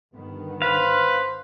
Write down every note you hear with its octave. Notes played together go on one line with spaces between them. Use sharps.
G1 D#3 B3
B4 C5 F5